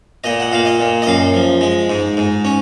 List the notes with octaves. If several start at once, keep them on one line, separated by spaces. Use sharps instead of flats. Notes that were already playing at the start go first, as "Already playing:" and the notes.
A#2 D#5
F#5
A#2 F5
D#5
A#2
D#5
F#2 F5
F3
G#3
G#2
G#2
C#4